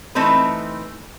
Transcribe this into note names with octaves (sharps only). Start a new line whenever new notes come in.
E3 A3 C4 D#4 B4